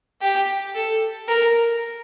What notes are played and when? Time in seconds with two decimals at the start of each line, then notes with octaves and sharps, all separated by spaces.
0.21 G4
0.75 A4
1.28 A#4